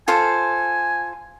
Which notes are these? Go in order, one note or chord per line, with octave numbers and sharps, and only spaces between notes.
F4 A4 C5 G#5